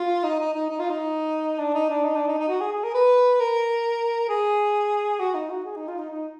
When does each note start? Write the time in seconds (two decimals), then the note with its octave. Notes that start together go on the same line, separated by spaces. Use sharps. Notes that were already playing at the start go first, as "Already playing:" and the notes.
Already playing: F4
0.23 D#4
0.40 D#4
0.53 D#4
0.69 D#4
0.79 F4
0.90 D#4
1.58 D4
1.74 D#4
1.90 D4
2.04 D#4
2.16 D4
2.27 D#4
2.39 D#4
2.49 F#4
2.61 G#4
2.72 G#4
2.84 A#4
2.94 B4
3.40 A#4
4.29 G#4
5.19 F#4
5.35 D#4
5.50 F#4
5.65 G#4
5.76 D#4
5.88 F4
5.98 D#4
6.10 D#4